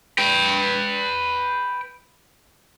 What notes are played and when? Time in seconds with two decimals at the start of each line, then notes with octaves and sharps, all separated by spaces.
0.18 B4 G5